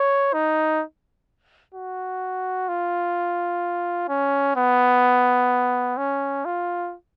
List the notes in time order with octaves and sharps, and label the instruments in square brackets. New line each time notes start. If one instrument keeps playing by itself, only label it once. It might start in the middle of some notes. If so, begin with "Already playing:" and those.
Already playing: [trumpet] C#5
D#4
F#4
F4
C#4
B3
C#4
F4